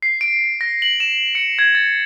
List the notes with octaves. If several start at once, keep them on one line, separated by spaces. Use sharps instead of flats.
C7
D7
A#6
F#7
E7
C#7
G#6
A6